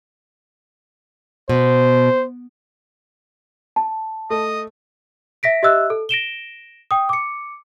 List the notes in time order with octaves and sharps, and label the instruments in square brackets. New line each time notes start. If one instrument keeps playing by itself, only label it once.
[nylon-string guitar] B2 [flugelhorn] C5
[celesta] A5
[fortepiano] A3 [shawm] D#5
[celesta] E5 A#6 B6 D7
G4 D#5 E5 E6 F#6
A4
A#6 D7 E7 G7
G5 D#6
D6 C#7